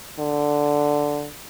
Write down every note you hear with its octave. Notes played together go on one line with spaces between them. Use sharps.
D3